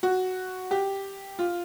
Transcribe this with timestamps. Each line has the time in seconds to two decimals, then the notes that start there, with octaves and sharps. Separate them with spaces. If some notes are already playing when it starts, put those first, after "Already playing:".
0.03 F#4
0.71 G4
1.39 F4